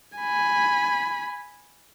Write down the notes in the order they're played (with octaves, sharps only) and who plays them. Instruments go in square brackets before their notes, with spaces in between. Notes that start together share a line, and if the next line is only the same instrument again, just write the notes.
[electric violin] G#5 B5